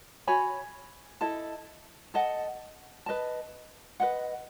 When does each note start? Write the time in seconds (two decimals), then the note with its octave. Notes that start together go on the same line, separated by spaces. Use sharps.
0.27 F#4 C#5 G#5 B5
1.21 E4 A4 D#5 A5
2.14 A4 D#5 F#5 A5
3.06 B4 D#5 A5
4.00 B4 D#5 F#5